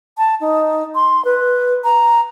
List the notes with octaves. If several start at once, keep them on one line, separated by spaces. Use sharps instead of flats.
A5
D#4
C6
B4
A#5